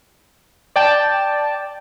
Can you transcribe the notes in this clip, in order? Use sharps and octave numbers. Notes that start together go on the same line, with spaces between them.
D5 G5 A5